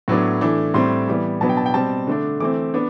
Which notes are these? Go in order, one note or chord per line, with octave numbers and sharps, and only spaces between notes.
A2 F#3 B3 D4
E3 A3 D4
A2 G3 C4 C6
E3 G3 B3
B2 F#3 B3 D4 A5
G5
A5
G5
B2 G3 C4 A5
D3 A3 D4
E3 A3 C4 D6
B3 D4